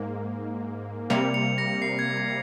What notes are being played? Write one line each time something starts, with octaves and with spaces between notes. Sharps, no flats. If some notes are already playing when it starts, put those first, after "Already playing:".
Already playing: G#2 A#3
C3 G3 A#3 C#7 F7
C#7 F7
A#6 C#7
C7
G#6
G#6